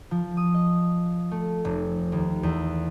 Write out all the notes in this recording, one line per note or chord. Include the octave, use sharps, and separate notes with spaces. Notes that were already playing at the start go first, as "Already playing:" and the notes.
F3
D#6
D#5
A3
F1
D#2
E2